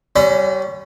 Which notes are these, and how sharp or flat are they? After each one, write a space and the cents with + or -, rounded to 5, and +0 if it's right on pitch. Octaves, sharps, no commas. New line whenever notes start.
G3 -30 C#4 +0 B5 +45